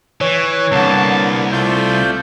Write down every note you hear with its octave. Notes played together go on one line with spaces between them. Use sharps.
E3 C#5
C2 D3 A#3 B3 A5
A3 F4 C5 D5 G6